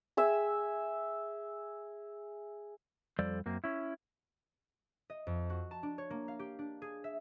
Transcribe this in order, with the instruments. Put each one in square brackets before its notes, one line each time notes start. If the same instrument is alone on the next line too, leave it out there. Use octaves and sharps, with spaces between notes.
[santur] G#4 E5 E6
[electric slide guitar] F2 G3 A4 C5 D5
F#2 A#3 C4
C#4 E4
[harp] D#5
F2
F#4
A5
D4
C#5
A#3
F5
G4
D4
G#4
E5